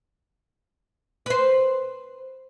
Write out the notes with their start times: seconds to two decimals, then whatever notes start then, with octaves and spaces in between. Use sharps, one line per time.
1.26 B4 C5